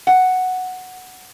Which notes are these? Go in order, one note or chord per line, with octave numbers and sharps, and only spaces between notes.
F#5